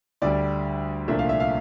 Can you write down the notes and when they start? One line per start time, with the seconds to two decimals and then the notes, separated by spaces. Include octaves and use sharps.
0.22 D2 D3 G3 D5
1.08 C2 A#2 F3 A3 D4 E5
1.19 F5
1.29 E5
1.40 F5